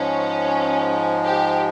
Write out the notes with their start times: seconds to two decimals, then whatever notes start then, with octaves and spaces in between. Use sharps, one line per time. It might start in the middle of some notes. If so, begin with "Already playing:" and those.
Already playing: G#2 F3 G#3 C#4
1.26 G4